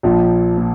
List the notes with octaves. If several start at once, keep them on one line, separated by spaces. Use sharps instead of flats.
A#1 A#2 F3
A#2